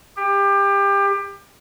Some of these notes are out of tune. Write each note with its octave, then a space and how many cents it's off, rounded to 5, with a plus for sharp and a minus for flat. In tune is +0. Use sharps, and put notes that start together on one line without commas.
G4 +25